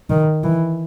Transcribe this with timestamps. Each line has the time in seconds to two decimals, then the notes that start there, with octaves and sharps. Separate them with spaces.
0.10 D#3
0.44 E3